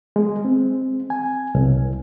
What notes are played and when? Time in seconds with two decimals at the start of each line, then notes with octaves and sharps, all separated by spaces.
0.16 G#3
0.45 C4
1.10 G#5
1.55 C2